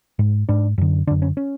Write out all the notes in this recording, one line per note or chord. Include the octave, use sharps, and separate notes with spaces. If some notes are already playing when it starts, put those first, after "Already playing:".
G#2
G#2 D4
F#2 D3
F#2 D3 D4
C#4
C#4